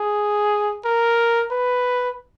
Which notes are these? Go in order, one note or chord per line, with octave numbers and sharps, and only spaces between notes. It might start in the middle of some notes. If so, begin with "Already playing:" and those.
Already playing: G#4
A#4
B4